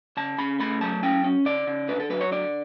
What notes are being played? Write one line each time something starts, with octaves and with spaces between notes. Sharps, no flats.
C#3 A5
C#3 B5
A3 B5
F#3 A5
C#4 G5
C#4
C#3 D5
C#3
D3 B4
A4
F#3 B4
C#5
D3 D5